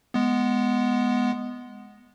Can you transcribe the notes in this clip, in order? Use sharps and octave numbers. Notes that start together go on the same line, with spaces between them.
G#3 B3